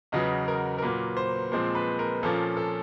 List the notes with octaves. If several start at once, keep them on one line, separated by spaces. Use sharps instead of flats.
E2 C#3 F#3 B3 D#5
A#4
A#4
A#2 F#3 A#3 B4
C5
A#2 F3 G#3 C4 C5
B4
A#4
A#2 F3 A#3 C#4 A4
A4